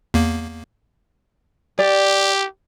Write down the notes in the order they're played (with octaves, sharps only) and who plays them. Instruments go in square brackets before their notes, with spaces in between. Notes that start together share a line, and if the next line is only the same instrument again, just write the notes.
[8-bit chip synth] E2 A#3
[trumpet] G4 [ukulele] D5